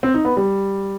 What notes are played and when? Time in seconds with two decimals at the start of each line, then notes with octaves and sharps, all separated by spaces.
0.03 C4
0.14 D#4
0.25 B3
0.37 G3